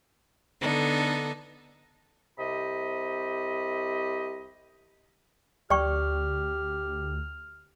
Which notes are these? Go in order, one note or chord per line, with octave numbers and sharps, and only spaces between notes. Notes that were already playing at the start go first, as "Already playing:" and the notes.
D3 B3 D4 D#4 A4
C2 C3 G4 D#5 B5
D2 G4 D5 G5 C#6 F6